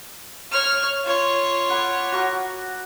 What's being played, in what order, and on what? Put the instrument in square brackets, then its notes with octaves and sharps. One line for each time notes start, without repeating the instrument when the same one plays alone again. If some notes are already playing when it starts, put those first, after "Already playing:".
[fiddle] C#5 F6
F4 C#5
[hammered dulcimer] F#5 B5 D6
F#4 A#4